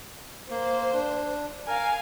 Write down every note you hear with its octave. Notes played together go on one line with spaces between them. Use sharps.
A#3 C5
D4
A#4 F5 G#5